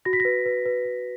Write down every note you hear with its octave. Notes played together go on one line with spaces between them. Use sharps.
F#4 A#6
B6
B4 A#6
B4
B4
B4